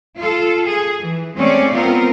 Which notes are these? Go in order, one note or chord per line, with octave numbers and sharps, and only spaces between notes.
F4 A4
G#4
E3
G#3 A3 C4 C#4 D5
B3 C4 F4 A#4